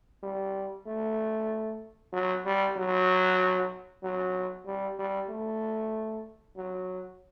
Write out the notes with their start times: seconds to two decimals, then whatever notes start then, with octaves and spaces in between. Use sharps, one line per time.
0.23 G3
0.87 A3
2.13 F#3
2.45 G3
2.77 F#3
4.03 F#3
4.66 G3
4.99 G3
5.29 A3
6.56 F#3